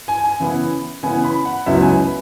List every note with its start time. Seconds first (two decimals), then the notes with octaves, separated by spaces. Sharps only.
0.08 G#5
0.24 G#5
0.40 C#3 E3 B3 E4
1.03 C#3 E3 B3 E4 G#5
1.24 B5
1.45 F#5
1.66 C#2 C#3 F#3 B3 E4 E5
1.82 G#5
1.98 B4